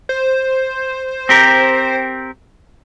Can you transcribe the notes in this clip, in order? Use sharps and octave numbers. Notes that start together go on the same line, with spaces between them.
C5
C4 G4 A#4